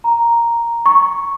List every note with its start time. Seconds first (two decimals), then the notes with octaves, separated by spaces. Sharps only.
0.04 A#5
0.86 C#6